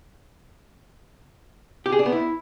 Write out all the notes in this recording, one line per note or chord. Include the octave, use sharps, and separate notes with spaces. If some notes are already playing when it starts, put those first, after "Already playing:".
G4
G#4
D4
B3
E4